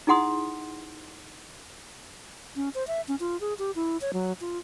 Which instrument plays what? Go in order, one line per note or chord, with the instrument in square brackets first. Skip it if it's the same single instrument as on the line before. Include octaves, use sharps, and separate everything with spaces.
[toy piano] D#4 E4 G#4 F#5 C6 D#6
[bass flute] C#4
C5
E5
C#4
F4
G#4
G4
E4
C#5
F#3
F4